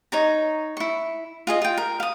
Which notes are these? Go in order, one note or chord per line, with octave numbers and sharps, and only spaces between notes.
D#4 C#5 A#5
E4 C#6
F4 G#4 D#5
F4 G5
A#4
F5 D#6